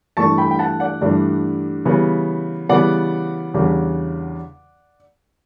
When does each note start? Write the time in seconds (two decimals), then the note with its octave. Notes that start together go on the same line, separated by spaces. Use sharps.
0.17 G2 E3 A3 D4 A5 C#6
0.38 G5 B5
0.51 G5
0.59 F#5 A5
0.80 D5 F#5
1.01 G2 E3 A3 D4
1.85 C#3 E3 G3 B3
2.69 C#3 E3 G3 B3 D5 F#5
3.54 E2 C#3 G3 D4